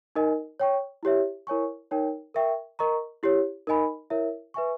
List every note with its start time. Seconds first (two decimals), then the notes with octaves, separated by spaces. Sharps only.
0.15 D#4 A#4 D#5 G#5
0.60 C#5 G5 C#6
1.03 E4 G4 C#5 E5
1.47 E4 A#4 C#5 G#5 C#6
1.91 D#4 A#4 C#5 G5
2.34 A#4 E5 G5 C#6
2.79 A#4 D#5 A#5 C#6
3.23 E4 G4 C#5
3.67 D#4 A#4 D#5 G#5 B5
4.10 E4 A#4 C#5 E5
4.54 B4 E5 G#5 C#6